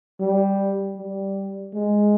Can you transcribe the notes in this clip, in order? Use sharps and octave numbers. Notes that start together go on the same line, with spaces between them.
G3
G3
G#3